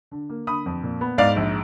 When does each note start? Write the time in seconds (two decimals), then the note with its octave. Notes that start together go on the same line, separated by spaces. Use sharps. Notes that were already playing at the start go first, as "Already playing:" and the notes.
0.11 D3
0.29 A#3
0.47 D3 B5 D#6
0.66 F2
0.83 A#2
1.01 B3
1.18 G#2 D5 F5
1.36 A#1